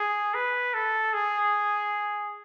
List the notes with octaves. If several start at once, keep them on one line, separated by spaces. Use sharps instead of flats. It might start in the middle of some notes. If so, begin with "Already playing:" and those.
Already playing: G#4
B4
A4
G#4